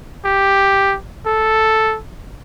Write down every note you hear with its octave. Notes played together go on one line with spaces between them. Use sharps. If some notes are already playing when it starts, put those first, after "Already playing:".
G4
A4